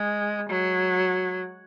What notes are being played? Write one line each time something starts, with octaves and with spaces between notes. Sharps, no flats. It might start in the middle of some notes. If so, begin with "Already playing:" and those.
Already playing: G#3
F#3